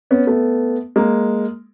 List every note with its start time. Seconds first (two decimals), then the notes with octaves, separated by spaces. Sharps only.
0.11 B3 C#4
0.27 A3 B3
0.96 G#3 A#3